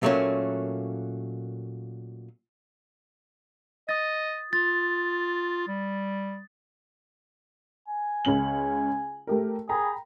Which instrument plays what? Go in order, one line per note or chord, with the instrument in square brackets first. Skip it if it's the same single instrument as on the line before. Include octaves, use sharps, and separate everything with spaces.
[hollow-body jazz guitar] A#2 F#3 A3 A#3 C#4
[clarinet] D#5 [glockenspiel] D#6 A6
[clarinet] F4 [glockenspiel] A6
[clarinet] G3
[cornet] G#5
[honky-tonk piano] C#2 C#4 F#7
A3 G4 A#4
[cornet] G#4 [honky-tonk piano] G5 A#5 B5